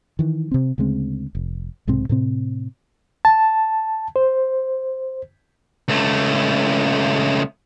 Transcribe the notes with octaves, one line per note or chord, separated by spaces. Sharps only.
D#3 E3
C3 C4
D2 C#3 G#3 C4
F1
B1 G#2 C3 C4
A2 C3 C4
A5
C5
C#2 A3